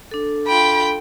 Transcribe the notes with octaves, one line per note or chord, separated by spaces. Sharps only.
D4 A4
F4 G5 B5